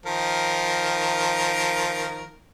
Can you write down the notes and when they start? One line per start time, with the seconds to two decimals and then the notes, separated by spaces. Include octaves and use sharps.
0.06 D#3 F3 A#4